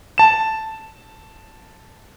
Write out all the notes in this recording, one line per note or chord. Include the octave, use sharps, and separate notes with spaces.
A5 E7